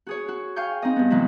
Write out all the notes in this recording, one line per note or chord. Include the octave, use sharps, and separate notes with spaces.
F#4 G#4 C#5
F#4
F5 G5 G#5 C#6 G6
C4 D#4 D#5
G2 B3
C3 E3 F#3 G#3 E4